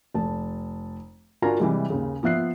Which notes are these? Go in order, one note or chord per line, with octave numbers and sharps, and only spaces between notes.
F1 A5
D4 F4 F#4 A#4 G#5 A#5
C3 E3 G3 G#3
D#2 C#3
F3 B3 E5 F#6 C7